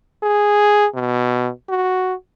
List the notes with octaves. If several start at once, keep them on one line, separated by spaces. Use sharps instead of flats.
G#4
B2
F#4